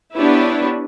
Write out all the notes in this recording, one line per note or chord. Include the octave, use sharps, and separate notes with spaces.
B3 D4 E4 G4 B4 C#5